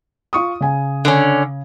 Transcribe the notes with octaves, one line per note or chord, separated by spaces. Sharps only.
F4 C#6 D#6
C#3 G#5
D3 C#4